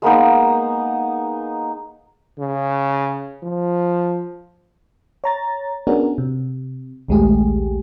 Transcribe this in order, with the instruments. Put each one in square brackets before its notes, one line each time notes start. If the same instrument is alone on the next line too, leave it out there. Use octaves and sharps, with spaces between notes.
[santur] G#3 A#3 B3 D#4
[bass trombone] C#3
F3
[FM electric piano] C#5 A#5 A6
B3 C#4 D4 F#4 G#4 A#4
C3
A#1 D#2 G#3 A3 G4 G#4